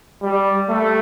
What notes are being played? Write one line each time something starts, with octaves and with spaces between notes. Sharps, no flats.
G3
A3